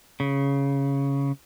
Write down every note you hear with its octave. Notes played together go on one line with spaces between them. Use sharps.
C#3